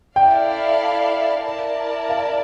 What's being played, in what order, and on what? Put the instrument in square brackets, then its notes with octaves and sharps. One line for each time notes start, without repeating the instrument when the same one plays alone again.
[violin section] E4 A4 D5 F5 [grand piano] G5
[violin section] E4 A#4 D5 A5
[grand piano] F5